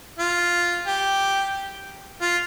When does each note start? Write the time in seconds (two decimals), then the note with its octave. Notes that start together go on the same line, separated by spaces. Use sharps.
0.19 F4
0.87 G4
2.21 F4